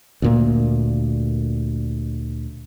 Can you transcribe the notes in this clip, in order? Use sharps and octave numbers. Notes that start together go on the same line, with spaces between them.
D2 A#2 A#3